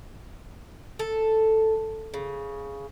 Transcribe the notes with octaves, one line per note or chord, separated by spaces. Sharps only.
A4
C#3